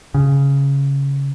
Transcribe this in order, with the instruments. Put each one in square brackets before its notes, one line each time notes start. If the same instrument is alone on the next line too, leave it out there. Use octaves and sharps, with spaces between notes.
[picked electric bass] C#3